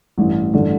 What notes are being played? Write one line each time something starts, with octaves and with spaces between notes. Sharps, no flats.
A1 G2 E3
A1 G2 D3